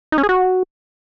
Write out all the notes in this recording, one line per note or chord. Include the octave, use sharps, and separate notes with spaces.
D#4
C#4
G#4
F#4